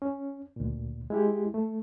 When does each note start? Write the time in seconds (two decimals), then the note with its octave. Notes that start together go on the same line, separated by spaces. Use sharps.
0.02 C#4
0.56 D2 A#2
1.10 G#3 E4 G4
1.54 A3